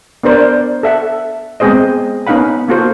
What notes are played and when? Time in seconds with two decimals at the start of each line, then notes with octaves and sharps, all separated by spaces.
0.24 B3 D4 A#4 C5 D5
0.83 A4 E5 F#5
1.60 G#3 B3 C4 G#4 C5 D#5
2.27 B3 C#4 D#4 F5 F#5 B5
2.68 A#3 F4 F#4 A4 C5